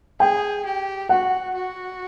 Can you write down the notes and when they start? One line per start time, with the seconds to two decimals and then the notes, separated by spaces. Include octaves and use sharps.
0.20 G#4 G5
0.65 G4
1.09 F#4 F#5
1.55 F#4